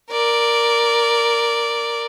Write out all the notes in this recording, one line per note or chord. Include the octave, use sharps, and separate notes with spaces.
A#4 D5